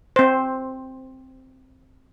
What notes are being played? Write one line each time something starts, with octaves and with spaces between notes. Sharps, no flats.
C4 C5